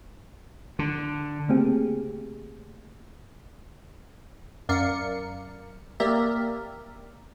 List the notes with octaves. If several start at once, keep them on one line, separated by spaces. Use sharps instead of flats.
D3
C#3 A3 A#3 C4 G4 G#4
F#2 A#4 D5 F5 C#7
A#3 G4 A#4 D5 E5